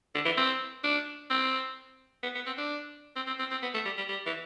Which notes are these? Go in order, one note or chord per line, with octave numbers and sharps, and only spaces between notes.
D3
E3
C4
D4
C4
B3
B3
C4
D4
C4
C4
C4
C4
B3
A3
G3
G3
G3
E3